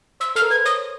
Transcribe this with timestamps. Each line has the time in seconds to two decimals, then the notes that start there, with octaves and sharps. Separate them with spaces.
0.20 C5 E6
0.36 A4 F6
0.42 A#4
0.51 B4 G#6
0.58 C5
0.65 C#5 D#6